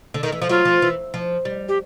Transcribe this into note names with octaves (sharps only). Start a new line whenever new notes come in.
D3
D#3
E3
F3
F#3 F4
F3
E3
F3
G3
G4